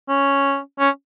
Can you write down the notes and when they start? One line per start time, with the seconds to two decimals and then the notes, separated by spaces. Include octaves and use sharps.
0.09 C#4
0.79 C#4